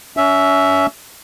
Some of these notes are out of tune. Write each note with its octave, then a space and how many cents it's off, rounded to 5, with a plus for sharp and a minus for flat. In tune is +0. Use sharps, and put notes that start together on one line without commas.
C#4 +30 E5 +0